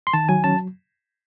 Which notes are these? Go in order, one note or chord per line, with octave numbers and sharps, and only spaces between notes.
C6
D#3 A5
F#3 G#5
C#4 A5